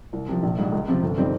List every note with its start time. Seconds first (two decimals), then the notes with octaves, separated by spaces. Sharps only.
0.13 C2
0.28 C3 F3
0.43 A#1
0.58 G#2 G3
0.72 C#2
0.88 C3 F3 C4 F4
1.02 G1
1.18 G3 C4 D#4